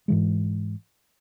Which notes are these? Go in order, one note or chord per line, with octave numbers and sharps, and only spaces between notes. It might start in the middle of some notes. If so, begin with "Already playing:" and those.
G#2 E3 G#3